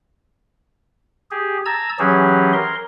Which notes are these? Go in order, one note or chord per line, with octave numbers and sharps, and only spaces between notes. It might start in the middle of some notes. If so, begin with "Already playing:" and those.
G4 G#4
A5 A#5 E6 G#6
E3 F#3 C#4 G4 G#4
A#4 C6